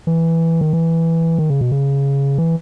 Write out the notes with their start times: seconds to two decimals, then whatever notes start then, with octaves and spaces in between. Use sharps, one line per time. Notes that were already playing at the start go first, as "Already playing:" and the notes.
0.07 E3
0.61 D#3
0.73 E3
1.39 D#3
1.50 C#3
1.61 B2
1.72 C#3
2.38 E3